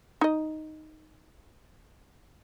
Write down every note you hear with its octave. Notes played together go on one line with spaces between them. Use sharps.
D#4 D#5